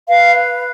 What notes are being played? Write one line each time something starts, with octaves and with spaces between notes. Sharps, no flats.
B4 F5